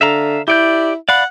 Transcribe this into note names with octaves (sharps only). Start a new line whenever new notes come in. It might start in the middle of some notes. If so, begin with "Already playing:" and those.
D3 E5 F5 A#5
E4 G4 D5 G6
D5 F5 F#5 B5